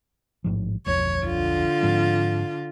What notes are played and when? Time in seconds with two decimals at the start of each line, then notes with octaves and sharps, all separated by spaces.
0.44 A1 G#2 F3
0.86 D1 B1 F2 C#5
1.24 D3 F4
1.83 G#2 F3 C4